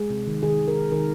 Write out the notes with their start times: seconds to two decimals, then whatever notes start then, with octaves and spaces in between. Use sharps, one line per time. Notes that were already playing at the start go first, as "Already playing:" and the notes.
Already playing: G#3 G#4
0.10 C3
0.27 D#3
0.43 D#3 G#4
0.60 D#3
0.68 A#4
0.75 D#3
0.92 D#3 A#4